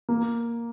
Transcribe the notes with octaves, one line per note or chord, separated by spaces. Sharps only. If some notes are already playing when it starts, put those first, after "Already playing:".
A#3